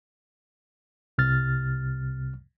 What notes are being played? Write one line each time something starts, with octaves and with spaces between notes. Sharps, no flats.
C2 C3 F6 A6